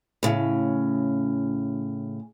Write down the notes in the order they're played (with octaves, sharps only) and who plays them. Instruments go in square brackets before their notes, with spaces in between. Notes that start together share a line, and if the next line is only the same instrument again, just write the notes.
[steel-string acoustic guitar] A2 C#3